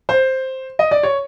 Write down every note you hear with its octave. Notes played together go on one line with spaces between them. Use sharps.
C5
D#5
D5
C#5